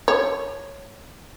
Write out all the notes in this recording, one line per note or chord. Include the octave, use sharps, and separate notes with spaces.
C#5